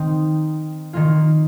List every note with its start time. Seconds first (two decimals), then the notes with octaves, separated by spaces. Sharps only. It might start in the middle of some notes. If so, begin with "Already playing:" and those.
Already playing: D#3 C4 D#4
0.93 D#3 A#3 F4